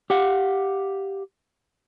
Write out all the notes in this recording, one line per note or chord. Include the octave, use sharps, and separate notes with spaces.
G4 F5 F#5